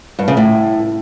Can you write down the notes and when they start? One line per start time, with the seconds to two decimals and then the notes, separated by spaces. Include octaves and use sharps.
0.19 G2
0.28 C#3
0.37 A2